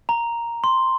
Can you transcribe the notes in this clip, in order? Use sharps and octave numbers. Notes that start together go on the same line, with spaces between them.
A#5
C6